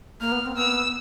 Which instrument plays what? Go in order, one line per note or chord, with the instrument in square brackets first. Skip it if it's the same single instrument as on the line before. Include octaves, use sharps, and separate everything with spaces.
[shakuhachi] A#3 [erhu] F6
[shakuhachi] B3
C4
[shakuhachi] B3 [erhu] E6